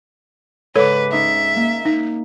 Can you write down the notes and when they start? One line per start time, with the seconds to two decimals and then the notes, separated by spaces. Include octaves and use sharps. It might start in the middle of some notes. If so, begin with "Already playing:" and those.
0.76 G#2 C#3 A4 B4 C#5 D6
1.12 C#4 D#4 E5
1.56 A#3
1.85 D#4